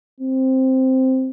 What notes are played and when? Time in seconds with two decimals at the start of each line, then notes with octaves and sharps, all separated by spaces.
0.20 C4